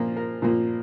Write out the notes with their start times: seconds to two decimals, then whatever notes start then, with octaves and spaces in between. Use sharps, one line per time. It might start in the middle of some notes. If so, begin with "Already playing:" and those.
Already playing: A#2 F3 A#3
0.16 A#4
0.42 A#2 F3 A#3